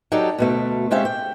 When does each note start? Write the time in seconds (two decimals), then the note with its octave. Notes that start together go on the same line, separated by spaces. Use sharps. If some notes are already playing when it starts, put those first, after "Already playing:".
0.12 F#3 D4 D#4 G4 A4
0.38 D2 B2 A3
0.91 G#3 C4 C#4 G4 E5 F5
1.05 G5